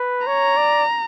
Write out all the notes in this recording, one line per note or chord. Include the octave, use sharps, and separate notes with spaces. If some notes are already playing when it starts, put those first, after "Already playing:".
Already playing: B4
C#5 A#5
D5